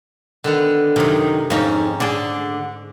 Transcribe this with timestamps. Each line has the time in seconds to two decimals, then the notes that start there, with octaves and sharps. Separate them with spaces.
0.44 D3 D#3 B3
0.96 F#2 C3 D#3
1.50 F2 G#2 C#4 D#4
2.00 D3 G#4 D5